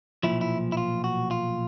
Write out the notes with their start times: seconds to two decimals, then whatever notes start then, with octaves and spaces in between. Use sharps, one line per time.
0.23 B1 A#2 F3 E4
0.41 E4
0.72 E4
0.77 F4
1.04 F#4
1.31 F4